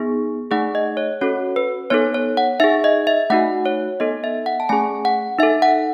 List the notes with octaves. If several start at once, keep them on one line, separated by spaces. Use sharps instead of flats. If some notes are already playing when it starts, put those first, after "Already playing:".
Already playing: B3 D#4 G#4
A3 D#4 G#4 F#5
D#5
C#5
C#4 F#4 A4 C#5
B4
B3 D#4 A4 C#5
C#5
F#5
D#4 G#4 E5
D#5
E5
A3 D#4 F#4 F#5
C#5
B3 D#4 A4 D#5
E5
F#5
A5
A3 C#4 G#4 G#5
F#5
D#4 A4 E5
F#5